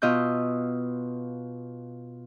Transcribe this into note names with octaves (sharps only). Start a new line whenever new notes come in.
B2 F4 D#5 E6 G6